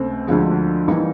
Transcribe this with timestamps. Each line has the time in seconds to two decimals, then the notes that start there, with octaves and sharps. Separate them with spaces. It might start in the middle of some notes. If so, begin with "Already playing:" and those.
Already playing: C#2 C3 A3 C4
0.27 D2 D3 F3 G#3
0.88 E3 G3 A#3 D#4